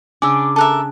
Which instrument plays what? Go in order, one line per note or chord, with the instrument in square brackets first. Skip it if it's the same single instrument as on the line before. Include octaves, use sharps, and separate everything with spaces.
[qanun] C#3 D4 [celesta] G#5 E6 [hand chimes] D6
[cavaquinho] A4 A#4 E5 [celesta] A5 F#6